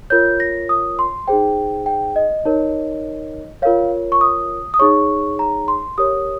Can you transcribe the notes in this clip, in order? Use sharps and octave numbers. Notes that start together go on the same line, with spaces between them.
F4 A#4 C#5 G6
A#6
D#6
C6
D#4 G#4 C5 G5
G5
D#5
D#4 A#4 C#5
F4 A#4 C#5 F5
C#6
D#6
D#6
D#4 G#4 C#5 C#6
A#5
C6
G4 A#4 C#5 D#6